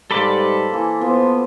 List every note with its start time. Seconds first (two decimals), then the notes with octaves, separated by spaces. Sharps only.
0.11 G#2 G3 A4 B4 C5 F5 B5 D6
0.70 E3 A#3
1.01 F3 B3 C5